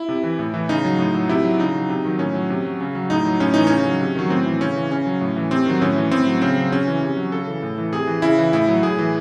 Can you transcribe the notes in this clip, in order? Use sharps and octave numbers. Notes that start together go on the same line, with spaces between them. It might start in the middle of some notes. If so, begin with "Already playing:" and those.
Already playing: E4
C3
E3
A2
E3
C#3 D#4
F#3
A2
F#3
C3 E4
F#3
C#3 D#4
F#3
C3
D#3 F#3
A2 C#4
F#3
C3
F#3
C#3
F#3
A2 D#4
F#3
A2 C#4
E3 D#4
C#3 C#4
F#3
C3
D#3 F#3
A2 C4
E3
C#3 C#4
E3
C#3 C#4
F#3
A2
E3
C3 C4
D#3 F#3
A2 C#4
E3
A2 C4
F#3
C#3 C4
F#3
C#3 C#4
E3
C3
F#3
C#3 A4
E3
A2
E3
C3 G#4
E3
C#3 E4
E3
A2 E4
F#3
A2 G#4
E3